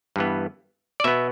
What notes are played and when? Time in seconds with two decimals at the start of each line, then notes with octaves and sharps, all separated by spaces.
0.16 G2 E3 B3
1.00 D5
1.04 B2 B3 E5